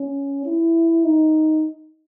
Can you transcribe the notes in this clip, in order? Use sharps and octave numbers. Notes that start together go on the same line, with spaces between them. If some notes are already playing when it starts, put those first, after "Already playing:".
Already playing: C#4
E4
D#4